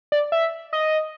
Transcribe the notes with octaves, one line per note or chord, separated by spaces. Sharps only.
D5
E5
D#5